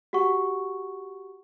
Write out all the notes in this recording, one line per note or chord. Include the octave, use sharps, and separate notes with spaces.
F#4 G4 F#5 C#6